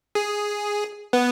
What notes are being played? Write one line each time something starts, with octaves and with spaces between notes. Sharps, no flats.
G#4
B3